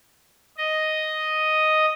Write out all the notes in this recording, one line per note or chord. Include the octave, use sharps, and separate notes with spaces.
D#5